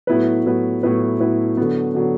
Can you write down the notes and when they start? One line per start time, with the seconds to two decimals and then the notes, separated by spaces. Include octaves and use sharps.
0.07 A2 F#3 B3 E4 B4
0.45 A2 F#3 B3 E4 B4
0.83 A2 F#3 B3 E4 B4
1.20 A2 F#3 B3 E4 B4
1.57 D3 F#3 B3
1.95 D3 F#3 B3